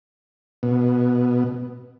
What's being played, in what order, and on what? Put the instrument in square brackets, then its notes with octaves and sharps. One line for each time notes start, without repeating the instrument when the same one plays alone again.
[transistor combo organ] B2